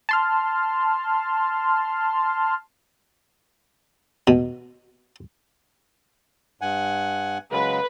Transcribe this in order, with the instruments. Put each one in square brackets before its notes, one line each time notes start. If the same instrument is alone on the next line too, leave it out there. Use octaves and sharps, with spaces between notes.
[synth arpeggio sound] A5 C6 F6
[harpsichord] B2
[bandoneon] G2 F#5 G#5
[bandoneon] C#3 F#3 G#3 [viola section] B4